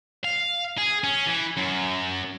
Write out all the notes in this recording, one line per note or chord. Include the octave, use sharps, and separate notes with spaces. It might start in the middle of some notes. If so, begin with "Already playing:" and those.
F5
G#4
C#4
E3
F#2